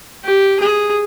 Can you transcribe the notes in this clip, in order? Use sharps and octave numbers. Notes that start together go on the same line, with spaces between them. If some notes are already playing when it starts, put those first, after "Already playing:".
G4
G#4